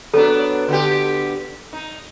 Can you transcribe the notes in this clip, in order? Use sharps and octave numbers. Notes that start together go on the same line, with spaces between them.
F#3 B3 D4 A4
D3 B3 G4
D#4